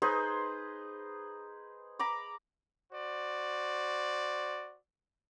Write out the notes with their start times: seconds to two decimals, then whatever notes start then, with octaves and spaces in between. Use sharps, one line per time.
0.02 D#4 G#4 B4 C5
1.99 A#5 B5 D6
2.92 F#4 C5 D5